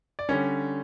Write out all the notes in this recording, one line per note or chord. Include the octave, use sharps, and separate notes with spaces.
D5
D3 G3 C#4 C#5